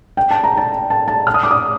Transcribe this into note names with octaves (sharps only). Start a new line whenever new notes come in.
G5
A5
A#5
A5
A5
A5
F6
D#6
D6
D#6